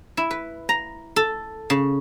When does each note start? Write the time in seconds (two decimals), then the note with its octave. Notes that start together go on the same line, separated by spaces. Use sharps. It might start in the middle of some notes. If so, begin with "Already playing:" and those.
0.17 E4
0.31 B4
0.69 A#5
1.16 A4
1.70 C#3